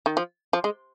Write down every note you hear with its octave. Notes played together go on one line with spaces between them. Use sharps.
D#3
F3
F3
G#3